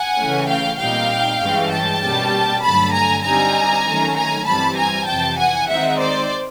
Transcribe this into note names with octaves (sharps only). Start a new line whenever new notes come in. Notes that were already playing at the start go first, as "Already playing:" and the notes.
Already playing: F#5 G#5
C#3 E3 A3 C#4
F5 G5
A#2 G3 C4 D#4 F5 G5
G2 E3 G#3 C#4
G5 A5
B2 G3 A#3 C#4
G2 D3 F#3 A3 A5 B5
G#5 A#5
D3 G3 C4 D#4 G#5 A#5
D#3 F#3 A3 C#4
G#5 A#5
G2 E3 G3 C4 A5 B5
G#5 A#5
F2 C3 E3 G5 A5
F#5 G#5
D#3 G#3 C4 D#4 E5 F#5
C5 D5